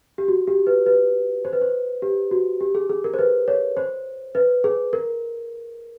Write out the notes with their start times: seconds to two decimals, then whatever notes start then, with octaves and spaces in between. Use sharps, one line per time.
0.18 G4
0.28 F#4
0.47 G4
0.67 B4
0.86 B4
1.45 C5
1.53 B4
1.61 C5
2.02 G4
2.31 F#4
2.61 G4
2.75 G#4
2.89 G#4
3.04 A#4
3.14 C5
3.19 B4
3.48 C#5
3.77 C5
4.35 B4
4.64 G#4
4.93 A#4